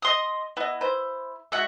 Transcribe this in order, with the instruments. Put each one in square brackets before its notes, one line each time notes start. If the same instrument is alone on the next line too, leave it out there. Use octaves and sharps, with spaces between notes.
[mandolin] D#5 C6 D#6
[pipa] B3 D#5 [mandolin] E4
[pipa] B4 C5
[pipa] G#3 F#4 [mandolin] E5 F#5